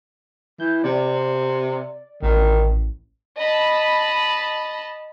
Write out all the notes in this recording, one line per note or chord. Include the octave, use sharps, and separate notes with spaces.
E3 G6
C3 D5
A1 D#3
D#5 A5 B5